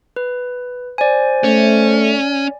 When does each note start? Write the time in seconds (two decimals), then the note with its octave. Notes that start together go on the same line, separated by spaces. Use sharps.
0.16 B4
0.98 C5 D5 G#5
1.44 A3 C#4